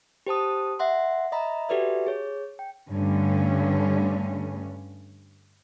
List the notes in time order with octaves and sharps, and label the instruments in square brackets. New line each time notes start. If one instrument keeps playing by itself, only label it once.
[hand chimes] G4 C5 A5 D#6
E5 F#5 C6
D#5 E5 A#5 B5
F#4 G4 A4 B4 D5 E5
G#4 C#5
G5
[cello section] G2 D3 A3 C#4